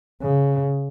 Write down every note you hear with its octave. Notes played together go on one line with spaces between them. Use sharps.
C#3